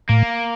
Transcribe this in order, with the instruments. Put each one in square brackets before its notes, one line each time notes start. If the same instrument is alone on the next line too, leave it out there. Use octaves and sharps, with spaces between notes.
[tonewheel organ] A2 [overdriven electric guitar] A#3